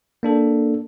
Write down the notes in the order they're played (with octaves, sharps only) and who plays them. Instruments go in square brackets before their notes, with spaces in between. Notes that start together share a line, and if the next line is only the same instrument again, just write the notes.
[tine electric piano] A#3 D4 A4